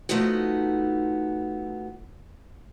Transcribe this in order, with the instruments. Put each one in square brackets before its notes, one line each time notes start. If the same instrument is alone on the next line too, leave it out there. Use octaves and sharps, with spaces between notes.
[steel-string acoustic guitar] F3 A3 B3 D#4 F#4